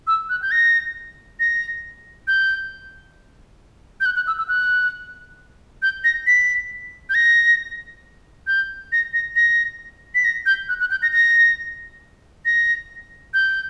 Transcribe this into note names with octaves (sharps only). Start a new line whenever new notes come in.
E6
F#6
G6
A#6
A#6
G6
G6
F#6
F#6
E6
E6
F#6
G6
A#6
B6
G6
A#6
G6
A#6
A#6
A#6
B6
A#6
G6
F#6
F#6
G6
A#6
A#6
A#6
G6